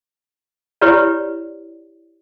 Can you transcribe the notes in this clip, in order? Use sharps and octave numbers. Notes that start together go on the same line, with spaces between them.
E4 G4 B4 C#5 D5